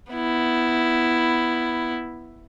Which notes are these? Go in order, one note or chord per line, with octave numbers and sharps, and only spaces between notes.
B3 E4